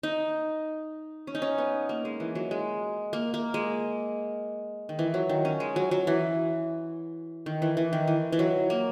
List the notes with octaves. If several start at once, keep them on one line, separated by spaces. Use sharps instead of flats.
D#4
C#4
D#4
C#4
B3
A#3
G#3
E3
F#3
G#3
A#3
A#3
G#3
D#3
E3
F#3
D#3
C#4
G#3
F#3
F#3
E3
D#3
E3
E3
D#3
E3
E3
F#3
A#3